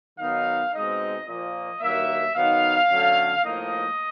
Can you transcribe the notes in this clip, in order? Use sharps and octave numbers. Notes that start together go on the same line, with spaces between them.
D#3 F#3 B3 D#4 F5
B2 G#3 C4 D#4 D#5
A#2 F3 A#3 D#5
G2 D#3 F#3 A#3 E5
D#3 F#3 B3 D#4 F5
D3 F#3 A3 C#4
A2 F3 A#3 D#4 D#5